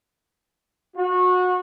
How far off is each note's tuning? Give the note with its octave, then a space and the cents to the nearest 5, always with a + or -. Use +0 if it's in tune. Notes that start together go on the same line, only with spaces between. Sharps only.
F#4 -25